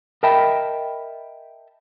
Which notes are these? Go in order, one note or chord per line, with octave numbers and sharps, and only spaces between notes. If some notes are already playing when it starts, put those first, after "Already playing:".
A#4 D#5 E5 G5 A5 B5